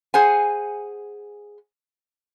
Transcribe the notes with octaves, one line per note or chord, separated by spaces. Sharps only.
G#4 C5 F#5 G#5